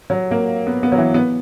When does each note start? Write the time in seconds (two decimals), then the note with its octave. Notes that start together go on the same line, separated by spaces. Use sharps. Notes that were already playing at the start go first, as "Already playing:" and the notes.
0.10 F#3
0.31 A#3
0.67 B3
0.83 B3
0.92 F#3
0.98 E3
1.14 B3